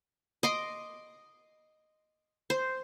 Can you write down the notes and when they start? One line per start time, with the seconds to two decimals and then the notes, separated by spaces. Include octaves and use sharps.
0.43 D#5 C6 D6
2.50 C5